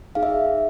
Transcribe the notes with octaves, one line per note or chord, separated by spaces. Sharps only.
D#4 G#4 F5
E5